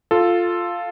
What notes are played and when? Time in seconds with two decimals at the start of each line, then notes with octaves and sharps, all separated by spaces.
0.11 F4 A4